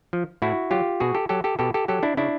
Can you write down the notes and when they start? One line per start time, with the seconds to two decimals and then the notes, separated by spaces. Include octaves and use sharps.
0.13 F3
0.42 A2 E4 F#4
0.71 F#3 F4 G4
1.00 B2 F#4 G#4
1.15 G4 A4
1.29 F#3 G4 A4
1.44 G4 A4
1.59 B2 G4 A4
1.74 G4 A4
1.88 F#3 G4 A4
2.03 D4 E4
2.17 C#3 D4 E4